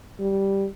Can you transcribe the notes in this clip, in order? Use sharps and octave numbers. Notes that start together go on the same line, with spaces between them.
G3